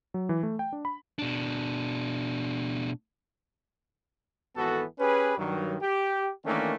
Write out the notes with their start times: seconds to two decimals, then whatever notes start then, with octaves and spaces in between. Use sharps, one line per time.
0.14 F#3
0.29 E3
0.43 A3
0.59 G5
0.73 D4
0.85 B5
1.19 B2 D4
4.56 G#1 E3 B3 F#4 A4
5.00 C#4 G4 G#4 B4
5.38 G2 D#3 F#3
5.81 G4
6.45 D#3 E3 A3 A#3 C#4 D4